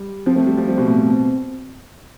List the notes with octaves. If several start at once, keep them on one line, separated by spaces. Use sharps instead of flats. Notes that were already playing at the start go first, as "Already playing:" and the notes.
Already playing: G3
F3 C4
A3
G3
F3
G3 C4
B2
A2
B2